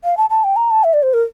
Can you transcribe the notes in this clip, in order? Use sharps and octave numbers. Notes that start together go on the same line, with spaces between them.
F5
A5
A5
G5
A#5
A5
E5
D5
C5
A#4